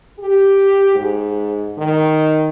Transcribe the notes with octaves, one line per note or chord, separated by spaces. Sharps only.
G4
G#2
D#3